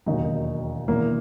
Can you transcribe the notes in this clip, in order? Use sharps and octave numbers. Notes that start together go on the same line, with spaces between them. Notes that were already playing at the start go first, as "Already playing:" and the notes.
E1 D#2 D#3 F#3 D#4
E1 E2 D#3 A#3